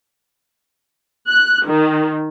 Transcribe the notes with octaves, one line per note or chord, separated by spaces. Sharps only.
F#6
D#3